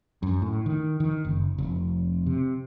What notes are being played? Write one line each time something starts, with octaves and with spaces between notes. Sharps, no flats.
F#2
A2
D#3
D#3
F#1
F1
C3